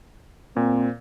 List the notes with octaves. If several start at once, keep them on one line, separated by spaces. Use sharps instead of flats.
A#2 C4